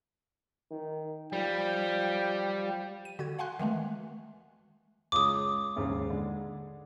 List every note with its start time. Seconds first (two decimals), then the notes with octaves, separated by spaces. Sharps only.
0.71 D#3
1.33 F3 G3 G5
3.05 D#7
3.19 D3 F#4 G#6
3.39 F5 F#5 G#5 C6 F#6
3.59 D#3 E3 G#3 A3
5.12 C#2 G#3 D6 D#6
5.76 D#2 G#2 C#3
6.10 D3 G#3